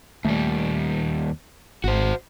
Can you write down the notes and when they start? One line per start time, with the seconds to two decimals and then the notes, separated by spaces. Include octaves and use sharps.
0.25 D#2 G3 A3
1.84 G#1 F#4 C5